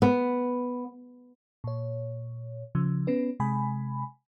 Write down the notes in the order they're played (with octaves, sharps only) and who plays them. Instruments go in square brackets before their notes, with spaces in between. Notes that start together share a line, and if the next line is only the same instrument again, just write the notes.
[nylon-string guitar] B3
[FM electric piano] A#2 C#5
C#3 F3
B3 C#4 B4
C3 G#3 G#5 B5